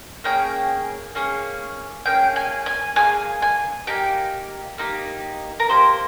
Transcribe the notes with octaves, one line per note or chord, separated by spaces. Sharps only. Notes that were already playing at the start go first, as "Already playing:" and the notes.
A#3 C#4 G#4 G5
A#3 C#4 G#4
A#3 C#4 G#4 G5
G#5
G#5
A#3 C#4 G#4 G#5
G#5
A#3 D#4 G4 G5
A#3 D#4 G4
A#4
A#3 D#4 G4 C5